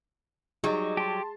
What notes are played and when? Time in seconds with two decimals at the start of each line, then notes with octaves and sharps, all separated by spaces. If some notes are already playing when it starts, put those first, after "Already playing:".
0.64 F#3 G3 D#4 G#4 D#5
0.97 G4 A5 C6